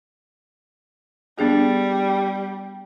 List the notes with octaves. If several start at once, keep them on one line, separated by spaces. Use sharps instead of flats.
G3 B3 D4 G#4